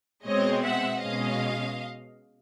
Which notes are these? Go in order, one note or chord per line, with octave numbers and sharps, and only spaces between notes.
B2 G#3 C4 C#5 D#5
E5 F#5
B2 G#3 C#4 D#5 F5